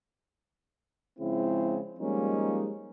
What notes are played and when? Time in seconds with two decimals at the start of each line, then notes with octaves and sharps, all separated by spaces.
1.19 C#3 F3 G#3 C4 E4
2.00 F3 G3 G#3 A#3 C#4 D#4